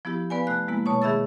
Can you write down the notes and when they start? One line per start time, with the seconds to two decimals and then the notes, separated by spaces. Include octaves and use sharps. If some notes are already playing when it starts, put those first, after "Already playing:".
0.05 F3 B3 E4 G4
0.30 B3 B4 D5 F5 G#5
0.47 C3 A3 F#6
0.68 G#3 A#3 B3 E4
0.86 B2 C#5 A5 C#6
1.02 D#3 G#4 E5 B5 E6 A6